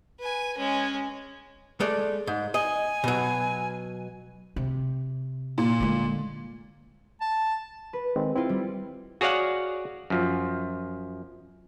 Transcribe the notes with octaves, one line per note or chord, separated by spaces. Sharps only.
B4 G#5
G#3 C#4
G#3 A3 D5
G#2
D#5 G#5
B2 F#3
C3
A#2
D3 G#3
A5
B4
D#3 G#3 C4
C4 E4 F4
G3
F#4 G#4 C#5 D5 F5 F#5
F#2 F3